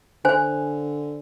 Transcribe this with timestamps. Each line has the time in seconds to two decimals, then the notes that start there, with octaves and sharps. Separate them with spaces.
0.25 D3 C5 G#5